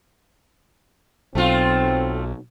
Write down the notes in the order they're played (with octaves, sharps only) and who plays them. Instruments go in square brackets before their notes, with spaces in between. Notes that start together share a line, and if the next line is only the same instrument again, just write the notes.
[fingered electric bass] B1 [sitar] A3 F4 [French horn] C4